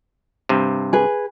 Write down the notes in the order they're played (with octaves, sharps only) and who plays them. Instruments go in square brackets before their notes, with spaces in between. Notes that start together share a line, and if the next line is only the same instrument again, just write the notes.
[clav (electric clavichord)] G2 C3
[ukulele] G#4 B4